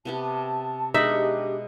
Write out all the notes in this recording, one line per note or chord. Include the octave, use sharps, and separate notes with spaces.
C3 B3 G4 A5
B2 G#3 D4 D#4 G4 E5 F#5